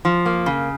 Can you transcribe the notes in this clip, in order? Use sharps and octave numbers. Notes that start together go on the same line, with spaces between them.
F3
A#3
C#3